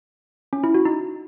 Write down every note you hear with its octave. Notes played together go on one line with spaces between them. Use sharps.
C#4
E4
F#4
D#4